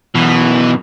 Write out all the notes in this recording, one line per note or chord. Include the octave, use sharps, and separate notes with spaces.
F#2 B2 E3